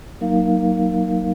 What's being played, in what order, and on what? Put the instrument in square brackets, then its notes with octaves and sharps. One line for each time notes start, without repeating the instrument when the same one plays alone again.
[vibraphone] F#3 A#3 D#4 A#4 F5